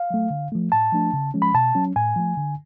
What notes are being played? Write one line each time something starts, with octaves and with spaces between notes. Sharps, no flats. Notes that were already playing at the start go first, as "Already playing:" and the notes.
Already playing: F5
F#3 A3
D3
F3 A3
A2 A5
F3 A3 D4
C#3
F3 G#3 C#4
B5
B2 A5
F#3 C#4
A2 G#5
F3 A3
D3